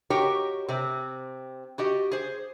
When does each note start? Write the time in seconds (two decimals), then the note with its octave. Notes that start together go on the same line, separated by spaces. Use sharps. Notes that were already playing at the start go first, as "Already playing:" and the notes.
0.10 F#4 G4 A#4 C#5 D#5 G5
0.68 C3 C4
1.78 F#4 G4 D#5
2.12 G#4 C5